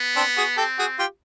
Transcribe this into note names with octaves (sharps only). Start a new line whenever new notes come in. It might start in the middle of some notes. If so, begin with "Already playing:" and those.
Already playing: B3
C4 D4
F#4 G#4
C4 G4 A4
F#4 G#4
F4 G4